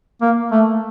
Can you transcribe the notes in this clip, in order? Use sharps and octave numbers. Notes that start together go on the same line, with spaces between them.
A#3
A3